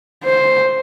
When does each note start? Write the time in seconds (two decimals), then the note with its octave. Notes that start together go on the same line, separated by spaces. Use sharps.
0.25 C5